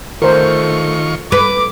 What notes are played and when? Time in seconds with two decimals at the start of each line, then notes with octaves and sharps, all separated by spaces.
0.22 D#3 A3 F4 A#4 C5 C#6
1.32 B4 D6